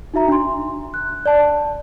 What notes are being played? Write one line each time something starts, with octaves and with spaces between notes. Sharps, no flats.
D#4 F#4 E5 A#5
D4 C6
F#6
D5 A5